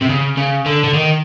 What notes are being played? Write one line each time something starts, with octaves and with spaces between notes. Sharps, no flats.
C3
C#3
C#3
D3
D3
D#3